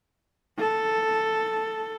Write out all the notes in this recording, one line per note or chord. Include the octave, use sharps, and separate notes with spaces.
A4